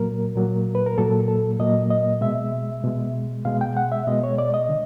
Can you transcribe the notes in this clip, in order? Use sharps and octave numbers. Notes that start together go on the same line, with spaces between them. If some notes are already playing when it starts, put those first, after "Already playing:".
Already playing: A#2 F#3 A#3 A#4
A#2 F#3 A#3
B4
A#4
A#2 F#3 A#3 A4
A4
A#2 F#3 A#3 D#5
D#5
B2 G#3 E5
B2 G#3
B2 G#3 F5
G5
F#5
E5
B2 G#3 D#5
C#5
D5
D#5
D3